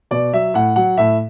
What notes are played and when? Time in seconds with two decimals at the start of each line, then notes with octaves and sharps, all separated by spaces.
0.11 B2 D5
0.33 F#3 E5
0.54 A2 F#5
0.76 F#3 F#5
0.97 A2 E5